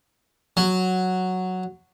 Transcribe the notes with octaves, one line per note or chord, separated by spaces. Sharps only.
F#3